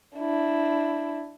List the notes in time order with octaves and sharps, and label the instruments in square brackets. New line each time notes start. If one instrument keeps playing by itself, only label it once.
[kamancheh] D4 E4